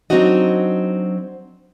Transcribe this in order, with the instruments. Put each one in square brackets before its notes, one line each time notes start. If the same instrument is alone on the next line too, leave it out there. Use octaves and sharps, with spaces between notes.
[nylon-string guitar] F#3 C4 D4 D#4 F#4 D#5